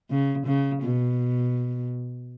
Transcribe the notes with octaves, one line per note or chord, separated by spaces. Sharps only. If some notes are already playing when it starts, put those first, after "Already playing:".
C#3
C#3
B2